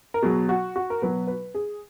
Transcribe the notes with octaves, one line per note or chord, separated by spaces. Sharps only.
A#4
B2 F#3 G#4
F#4
F#4
A#4
B2 F#3 B4
B4
G#4